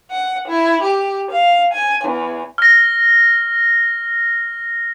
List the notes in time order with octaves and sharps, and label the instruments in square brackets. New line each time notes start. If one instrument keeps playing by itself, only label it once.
[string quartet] F#5
E4
G4
F5
G#5
E2
[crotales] F6 A#6